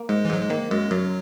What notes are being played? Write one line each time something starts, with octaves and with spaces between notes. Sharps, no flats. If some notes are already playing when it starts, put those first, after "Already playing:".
Already playing: A#3
G#2 G#3
E3
G#2 F#3
G#3
D#3 A#3
F#2 G#3
F#2 F#3